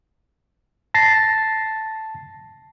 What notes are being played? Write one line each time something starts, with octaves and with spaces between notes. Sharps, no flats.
A5 A6 A#6 C7